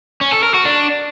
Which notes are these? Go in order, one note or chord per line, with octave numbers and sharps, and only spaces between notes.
C#4
A4
A#4
F#4
D4